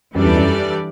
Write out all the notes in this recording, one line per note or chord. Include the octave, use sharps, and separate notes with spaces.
F#2 E3 G3 D4 A4 D5
E2
F#2